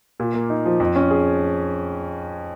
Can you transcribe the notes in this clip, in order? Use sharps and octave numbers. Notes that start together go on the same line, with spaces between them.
A#2
A#3
D#4
F3
F2
C#4
G#4